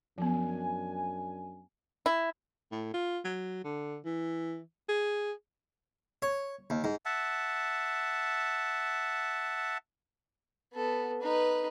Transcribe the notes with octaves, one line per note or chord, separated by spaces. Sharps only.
F#2 F3 B3 D4 G#5
E4
A2
F4
F#3
D3
E3
G#4
C#5
D#2
G#2
E5 F#5 A5
B3 A4
D#4 B4